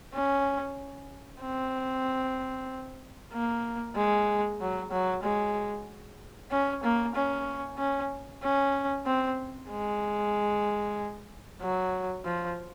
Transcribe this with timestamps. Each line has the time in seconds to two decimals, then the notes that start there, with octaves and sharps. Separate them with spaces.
0.15 C#4
1.42 C4
3.33 A#3
3.96 G#3
4.61 F#3
4.92 F#3
5.24 G#3
6.51 C#4
6.84 A#3
7.15 C#4
7.78 C#4
8.43 C#4
9.06 C4
9.71 G#3
11.61 F#3
12.25 F3